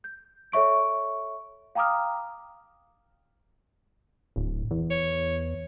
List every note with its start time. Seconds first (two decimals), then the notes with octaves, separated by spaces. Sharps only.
0.04 G6
0.52 A4 C#5 E5 C#6 D7
1.75 F5 G5 A#5 D6 D#6 F6
4.36 D1
4.71 E2
4.91 C#5